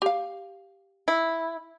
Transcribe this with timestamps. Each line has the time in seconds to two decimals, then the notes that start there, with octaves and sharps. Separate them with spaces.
0.02 G4 F5
1.08 E4